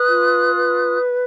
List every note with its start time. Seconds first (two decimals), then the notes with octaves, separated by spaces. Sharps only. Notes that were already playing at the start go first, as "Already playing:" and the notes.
Already playing: B4 D#6 F#6
0.09 F4
0.55 B4